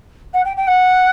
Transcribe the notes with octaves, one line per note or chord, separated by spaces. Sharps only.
F#5
G5
G5
F#5